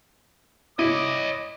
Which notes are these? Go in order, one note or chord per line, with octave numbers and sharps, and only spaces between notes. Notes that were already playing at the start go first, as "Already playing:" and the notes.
E4 C#5 D#5 D6